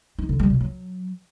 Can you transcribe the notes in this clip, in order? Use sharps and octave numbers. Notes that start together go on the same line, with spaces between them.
D#4
D3
G3
B2
F#3